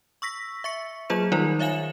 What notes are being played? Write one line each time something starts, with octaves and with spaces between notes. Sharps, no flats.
C#6 E6 A#6 B6
E5 C#6 C#7
F#3 A#3 F4 G#4 C5 E7
D#3 G3 D#4 F4 A#4 D5
C#5 E5 F5 G#5 E7 F#7